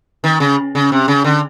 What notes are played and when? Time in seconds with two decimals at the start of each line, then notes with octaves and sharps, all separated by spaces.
0.24 D#3
0.40 C#3
0.75 C#3
0.92 C3
1.08 C#3
1.24 D3